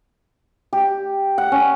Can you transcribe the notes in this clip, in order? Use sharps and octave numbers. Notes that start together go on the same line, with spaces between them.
G4
F#5
C#4